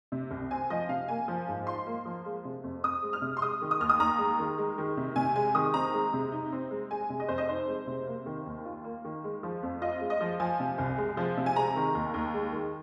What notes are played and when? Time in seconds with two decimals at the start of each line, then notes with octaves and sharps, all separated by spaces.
0.12 C3
0.31 C2
0.51 C4 G#5
0.70 F3 D#5
0.89 C3 F5
1.08 A#3 G#5
1.28 F3
1.48 G#2
1.67 F4 C6
1.87 A#3
2.05 F3
2.25 G#3
2.45 C3
2.63 F2
2.84 C4 D#6
3.03 G#3
3.13 F6
3.22 C3
3.37 C6
3.42 G#3 D#6
3.62 D#3
3.71 D#6
3.80 D#2 F6
3.89 D#6
3.99 D#2 A#5
4.19 G#3
4.39 D#3
4.58 G#3
4.78 D#3
4.97 C3
5.16 C3 G#5
5.36 G#3 G#5
5.55 D#3 D#6
5.74 C4 A#5
5.94 G#3
6.13 C3
6.32 D#4
6.53 C4
6.71 G#3
6.91 G#3 G#5
7.10 C3
7.20 D#5
7.28 F2 C5
7.38 D#5
7.49 D#4 C5
7.68 G#3
7.87 C3
8.07 A#3
8.26 D#3
8.46 D#2
8.65 F4
8.84 A#3
9.05 D#3
9.24 G#3
9.43 F3
9.63 F2
9.82 F4 D#5
10.01 G#3
10.10 D#5
10.21 F3
10.40 F3 G#5
10.60 C3
10.78 C2
10.98 G#3
11.17 F3
11.37 C3
11.46 G#5
11.56 G#3 A#5
11.76 D#3
11.94 D#2
12.14 D#2
12.34 G#3
12.53 D#3